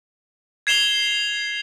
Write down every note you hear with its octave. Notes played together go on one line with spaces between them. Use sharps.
G#6 C7 E7 F7 G7